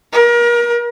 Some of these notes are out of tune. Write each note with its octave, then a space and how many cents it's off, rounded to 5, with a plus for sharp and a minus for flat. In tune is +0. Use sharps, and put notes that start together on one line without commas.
A#4 +35